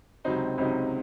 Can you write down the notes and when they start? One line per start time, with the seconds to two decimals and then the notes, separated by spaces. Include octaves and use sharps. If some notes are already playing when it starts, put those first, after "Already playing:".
0.24 C#2 C3 F#3 C4 D#4
0.58 C#2 C3 F#3 C4 D#4